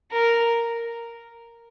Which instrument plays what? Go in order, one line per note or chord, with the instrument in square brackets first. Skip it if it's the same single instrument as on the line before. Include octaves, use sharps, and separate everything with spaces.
[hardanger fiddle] A#4